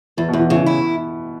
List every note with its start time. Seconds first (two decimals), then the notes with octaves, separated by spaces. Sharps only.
0.17 E2 E3
0.28 B2
0.33 E2
0.39 E3
0.50 C#3 E3
0.61 E3
0.66 E4